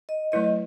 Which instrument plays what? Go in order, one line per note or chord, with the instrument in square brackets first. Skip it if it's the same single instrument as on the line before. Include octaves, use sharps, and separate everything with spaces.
[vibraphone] D#5
[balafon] F#3 A3 E4 B4 [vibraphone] D#5